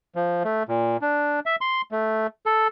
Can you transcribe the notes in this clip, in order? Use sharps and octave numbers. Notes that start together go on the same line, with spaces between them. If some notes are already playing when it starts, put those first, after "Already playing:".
F3
A3
A#2
D4
E5
C6
A3
A4